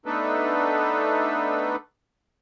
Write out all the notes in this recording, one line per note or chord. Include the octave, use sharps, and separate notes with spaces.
A3 B3 D4 D#4 A4 B4